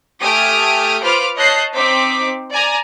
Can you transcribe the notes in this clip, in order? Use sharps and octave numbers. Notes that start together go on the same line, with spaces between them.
A3 G4 G#5 D#6 F6 D7
F4 B4 C5 B5 D6 F6
C#5 D#5 A5 F#6 G6 C7
C4 D#4 C5 D6 B6
D5 G#5 A#5